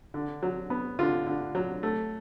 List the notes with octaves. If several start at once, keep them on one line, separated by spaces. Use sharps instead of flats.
D3
F#3
B3
D3 F4
D3
F#3
A3